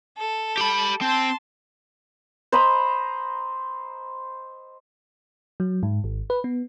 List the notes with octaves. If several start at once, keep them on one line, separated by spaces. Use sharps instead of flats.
A4
G4 B5
C4 A5 C6
C5 D#5 A#5 B5
F#3
G#2
G#1
B4
B3